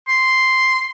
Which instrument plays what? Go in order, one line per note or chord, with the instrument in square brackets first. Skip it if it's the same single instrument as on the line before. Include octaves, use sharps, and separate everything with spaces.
[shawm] C6